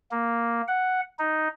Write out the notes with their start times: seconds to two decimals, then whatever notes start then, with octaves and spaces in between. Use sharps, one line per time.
0.11 A#3
0.68 F#5
1.19 D#4